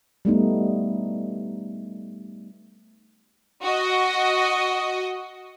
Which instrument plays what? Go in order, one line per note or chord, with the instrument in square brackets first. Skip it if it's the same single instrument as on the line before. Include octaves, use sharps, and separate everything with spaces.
[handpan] G3 A3 B3 D#4
[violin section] F#4 D#5